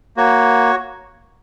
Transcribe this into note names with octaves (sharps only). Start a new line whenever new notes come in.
A#3 F#4 C#5